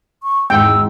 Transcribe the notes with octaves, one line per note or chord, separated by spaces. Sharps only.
C#6
G#1 E2 G#2 G5 E6